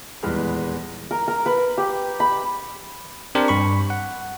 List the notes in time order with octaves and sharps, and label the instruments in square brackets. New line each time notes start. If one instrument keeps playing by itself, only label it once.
[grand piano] D#1 E2 G3 G#3 B4 F6
[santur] A#4
A#4
B4
G4
B5
[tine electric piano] C4 D4 G4 A#4 C5
G2 B5 C#6
F#5